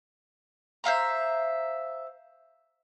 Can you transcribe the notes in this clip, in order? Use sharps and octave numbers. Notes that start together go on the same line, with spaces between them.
C5 E5 F5 A#5